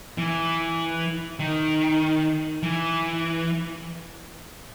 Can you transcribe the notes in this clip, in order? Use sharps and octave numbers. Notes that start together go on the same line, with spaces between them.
E3
D#3
E3